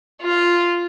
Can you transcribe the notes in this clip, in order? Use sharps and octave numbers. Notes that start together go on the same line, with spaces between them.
F4